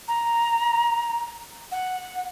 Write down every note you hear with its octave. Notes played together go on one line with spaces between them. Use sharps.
A#5
F#5